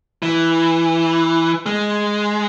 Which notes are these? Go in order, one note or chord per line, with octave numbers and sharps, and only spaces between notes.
E3
G#3